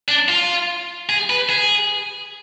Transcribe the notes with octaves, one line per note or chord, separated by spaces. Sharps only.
D4
F4
G#4
B4
G#4